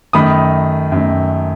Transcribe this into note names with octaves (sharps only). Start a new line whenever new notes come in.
F#2 D#3 A3 B5 D#6
F#2 D#3 A3